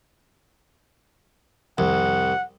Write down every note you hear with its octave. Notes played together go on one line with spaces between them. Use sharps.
C2 F2 D#3 F3 F#5